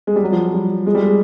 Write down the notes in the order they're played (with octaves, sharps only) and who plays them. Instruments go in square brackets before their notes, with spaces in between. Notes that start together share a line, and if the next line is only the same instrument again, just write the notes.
[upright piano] G#3
G3
F#3
F3
G3
G#3
G3
G#3